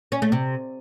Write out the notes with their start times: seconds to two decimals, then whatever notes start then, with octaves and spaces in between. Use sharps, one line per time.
0.12 C#4
0.22 A3
0.32 C3